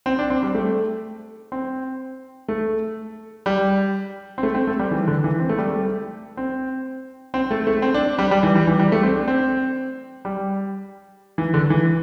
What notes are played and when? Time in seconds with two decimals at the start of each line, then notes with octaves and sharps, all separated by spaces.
0.06 C4
0.19 D4
0.30 C4
0.43 G3
0.55 A3
1.52 C4
2.48 A3
3.46 G3
4.38 C4
4.43 A3
4.55 C4
4.67 A3
4.79 G3
4.91 E3
5.08 D3
5.24 E3
5.40 C4
5.49 A3
5.58 G3
5.68 A3
6.37 C4
7.34 C4
7.51 A3
7.67 A3
7.82 C4
7.94 D4
8.18 G3
8.31 G3
8.43 E3
8.55 G3
8.67 E3
8.79 G3
8.92 A3
9.03 C4
9.16 D4
9.28 C4
10.25 G3
11.38 E3
11.54 D3
11.70 E3